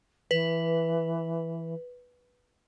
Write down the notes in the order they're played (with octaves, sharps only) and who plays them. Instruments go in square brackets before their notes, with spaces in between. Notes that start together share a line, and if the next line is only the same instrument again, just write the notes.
[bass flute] E3 [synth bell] B4